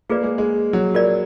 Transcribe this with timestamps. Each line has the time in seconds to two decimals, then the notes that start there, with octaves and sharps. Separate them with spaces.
0.10 A#3 F4 G#4 B4 D5
0.23 G#3
0.38 G#3
0.73 F#3
0.95 F4 A#4 D5